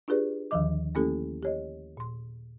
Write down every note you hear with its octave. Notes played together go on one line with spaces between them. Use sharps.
D4 F4 G4 G#4 B4 D5
D#2 D3 D#3 F3 D#5 D6
A3 A#3 C#4 E4 G4 A4
G4 C#5 D#5
A#2 C6